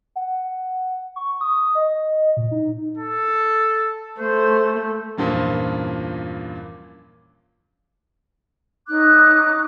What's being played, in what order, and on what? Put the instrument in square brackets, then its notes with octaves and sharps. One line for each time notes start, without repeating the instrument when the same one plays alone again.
[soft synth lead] F#5
C#6
D#6
D#5
A#2
D#4
[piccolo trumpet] A4
[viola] A3 [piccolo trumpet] C5
[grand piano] E2 G2 A#2 F3 A#3 C#4
[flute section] C#4 D#4 D6 F#6